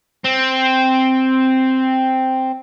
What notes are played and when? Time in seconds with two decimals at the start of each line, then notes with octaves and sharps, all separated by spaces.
0.25 C4